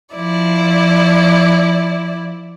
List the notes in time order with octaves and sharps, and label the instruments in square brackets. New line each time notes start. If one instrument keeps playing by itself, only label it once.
[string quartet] F3 E4 D5